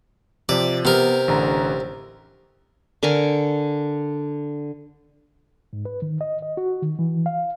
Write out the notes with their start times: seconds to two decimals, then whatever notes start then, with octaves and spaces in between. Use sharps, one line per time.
0.49 C3 F3 D5
0.85 C3 B3 A#4
1.28 A1 D3 A#5
3.03 D3 A#4 G#5 C#6
5.73 G#2
5.85 B4
6.02 D#3
6.21 D#5
6.42 D#5
6.57 F#4
6.83 D#3
6.99 E3
7.26 F5